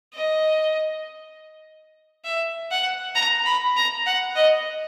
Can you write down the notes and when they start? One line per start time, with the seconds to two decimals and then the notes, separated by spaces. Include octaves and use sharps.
0.14 D#5
2.25 E5
2.71 F#5
3.15 A#5
3.46 B5
3.77 A#5
4.06 F#5
4.36 D#5